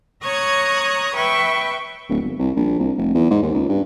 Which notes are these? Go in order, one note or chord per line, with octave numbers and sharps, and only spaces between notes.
C#5 A#5 C#6 D#6 F#6 G#6
B4 E5 G5 C#6
D1
G1
C2
A#1
C2
F1
E2
G#2
D#2
C#2
G2